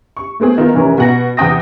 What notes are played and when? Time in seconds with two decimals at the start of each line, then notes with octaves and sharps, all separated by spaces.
0.17 C#6
0.40 A3 B3 C4 G#4
0.58 D#3 B3 F4
0.74 F1 E3 C#4 A#4
0.98 B2 F#5 A#6
1.37 E2 C3 F#5 G5 D#6 A#6